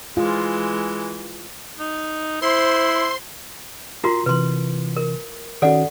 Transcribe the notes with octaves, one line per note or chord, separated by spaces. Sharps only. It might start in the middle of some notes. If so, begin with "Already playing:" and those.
E3 G#3 F4
D#4
E4 C5 C6
F4 F#4 A#4 A#5 C6
C3 E3 B4 C6
A#4
D#3 C#4 F#4 A4 D5 F#5